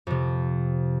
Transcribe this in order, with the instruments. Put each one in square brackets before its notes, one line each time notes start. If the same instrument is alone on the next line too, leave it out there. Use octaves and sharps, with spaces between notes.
[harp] F2 C3